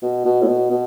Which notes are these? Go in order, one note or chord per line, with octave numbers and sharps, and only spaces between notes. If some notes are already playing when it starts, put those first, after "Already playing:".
B2
B2
A2
B2
B2